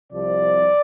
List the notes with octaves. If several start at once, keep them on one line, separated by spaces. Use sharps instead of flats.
C2 C3 F3 D5